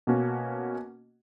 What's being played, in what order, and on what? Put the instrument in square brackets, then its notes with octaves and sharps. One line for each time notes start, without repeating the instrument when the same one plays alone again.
[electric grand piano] B2 A#3 C#4 F#4